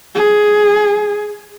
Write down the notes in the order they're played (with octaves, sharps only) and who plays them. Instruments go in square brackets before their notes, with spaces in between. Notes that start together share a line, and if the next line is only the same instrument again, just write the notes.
[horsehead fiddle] G#4